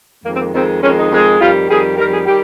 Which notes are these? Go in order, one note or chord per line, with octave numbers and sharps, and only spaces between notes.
F2 D#3 G#3 A#3
C4
A#3
F2 D#3 G#3 C4
F2 D#3 G#3 C#4
D#4
F2 D#3 G#3
F2 D#3 G3 F4
F2 D#3 G3 G#4
F2 D#3 G3 A#4
G#4
D#3 G3 G4